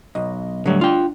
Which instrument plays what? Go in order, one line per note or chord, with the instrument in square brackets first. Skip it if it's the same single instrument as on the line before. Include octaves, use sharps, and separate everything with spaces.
[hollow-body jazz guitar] B1 [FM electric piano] D#5
[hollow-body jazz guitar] A2 F#3 [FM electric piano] D3 G3 A3
[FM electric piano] D4 [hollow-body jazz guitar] F4 G5